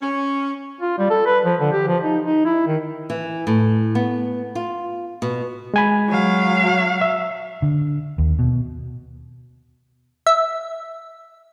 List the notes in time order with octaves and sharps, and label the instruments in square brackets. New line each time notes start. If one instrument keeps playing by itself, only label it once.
[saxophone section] C#4
[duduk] F4
G3
A4
B4
F3
D3
G4
F3
D#4
D#4
E4
D#3
[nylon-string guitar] E3
A2
B3
F4
B2
[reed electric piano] G#3 G#5 B5
[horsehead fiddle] F#3 F5
[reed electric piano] E5
[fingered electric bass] D3
D#2
B2
[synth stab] E5